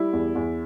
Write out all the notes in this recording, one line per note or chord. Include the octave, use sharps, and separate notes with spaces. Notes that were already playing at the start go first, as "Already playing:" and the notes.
Already playing: G3 E4
E2
E2